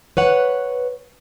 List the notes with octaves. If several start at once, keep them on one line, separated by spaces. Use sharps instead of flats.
B4 C#5 F#5